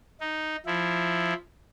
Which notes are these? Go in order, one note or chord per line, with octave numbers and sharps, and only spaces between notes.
D#4
F3 E4